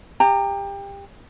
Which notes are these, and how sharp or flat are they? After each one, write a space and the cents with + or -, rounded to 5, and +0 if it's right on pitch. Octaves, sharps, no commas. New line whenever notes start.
G4 +25 A#5 -25